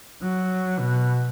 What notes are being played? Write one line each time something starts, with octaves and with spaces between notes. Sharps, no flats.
F#3
B2